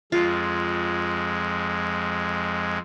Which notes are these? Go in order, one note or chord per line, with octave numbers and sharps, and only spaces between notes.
F2 G#3 F4